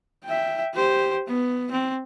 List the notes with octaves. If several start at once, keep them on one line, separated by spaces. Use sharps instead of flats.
E5 G5
G4 C5
B3
C4